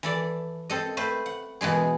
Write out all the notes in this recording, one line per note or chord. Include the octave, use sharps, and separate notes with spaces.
E3 A4 D5
C4 A4 D#5
A3 B4 C5
F#5
B2 E3 G#3 G#4